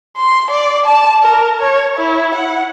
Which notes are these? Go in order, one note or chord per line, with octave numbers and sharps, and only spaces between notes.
C6
D5
A5
A#4
C#5
E4
F#5